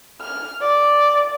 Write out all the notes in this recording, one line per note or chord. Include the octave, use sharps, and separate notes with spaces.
F6
D5